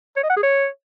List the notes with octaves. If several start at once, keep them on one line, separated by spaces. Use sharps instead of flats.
C#5
D#5
F#5
G#4
C#5